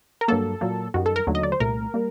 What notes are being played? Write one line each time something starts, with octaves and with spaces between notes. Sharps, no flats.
A#4
G2 F#3 A#3 A4
A#2 F#3 A#3
F#2 D#3 G3 F#4
A4
A#4
D#2 D3 F#3 A3
D#5
D5
C5
C2 A#2 A3 A#4
G3 A#3